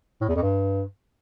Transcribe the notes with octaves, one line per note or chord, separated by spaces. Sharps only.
A2
E2
F2
G2